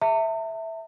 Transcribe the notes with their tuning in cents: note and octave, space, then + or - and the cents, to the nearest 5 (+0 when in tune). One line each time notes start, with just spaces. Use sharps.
E5 -5 A5 +45